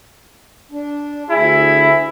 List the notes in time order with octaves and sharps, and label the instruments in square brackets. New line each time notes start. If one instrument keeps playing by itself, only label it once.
[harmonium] D4
[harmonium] D2 G#4 [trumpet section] E4